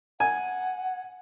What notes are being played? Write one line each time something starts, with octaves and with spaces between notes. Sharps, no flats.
F#5 G#5